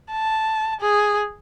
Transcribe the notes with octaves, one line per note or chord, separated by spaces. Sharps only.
A5
G#4